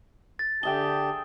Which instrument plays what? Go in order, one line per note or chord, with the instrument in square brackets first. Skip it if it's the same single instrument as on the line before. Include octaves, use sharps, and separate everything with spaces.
[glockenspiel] A6
[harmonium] D3 G4 A5 [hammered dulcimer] G#4 E5 G5 [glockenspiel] G7